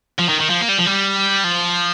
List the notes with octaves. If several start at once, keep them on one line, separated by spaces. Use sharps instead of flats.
F3
D#3
D#3
F3
A#3
G3
F3
G3
F3